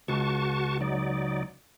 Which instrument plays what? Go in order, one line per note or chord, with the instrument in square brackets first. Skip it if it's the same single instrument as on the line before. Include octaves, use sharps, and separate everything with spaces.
[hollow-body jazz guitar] C#2 [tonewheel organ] F#4 A5 C#6
[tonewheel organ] F#3 D#4 D5